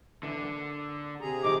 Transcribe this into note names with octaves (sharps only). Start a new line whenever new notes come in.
D3 E3
A#3
C3 G#4 A#5
D#3 F3 G#3 D6